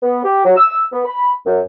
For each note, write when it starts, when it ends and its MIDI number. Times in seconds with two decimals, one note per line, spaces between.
0.03 0.22 59
0.23 0.44 67
0.45 0.52 54
0.56 0.83 88
0.93 1.01 59
1.05 1.33 83
1.45 1.59 42